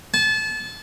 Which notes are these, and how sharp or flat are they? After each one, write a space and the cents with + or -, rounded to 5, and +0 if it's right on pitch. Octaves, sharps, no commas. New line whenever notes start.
A5 -30